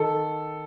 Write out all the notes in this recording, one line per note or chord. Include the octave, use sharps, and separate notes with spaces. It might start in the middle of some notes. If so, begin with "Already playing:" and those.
Already playing: D#3 A4